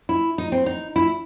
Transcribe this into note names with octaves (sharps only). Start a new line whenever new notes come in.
E4
D#4
C4
D#4
E4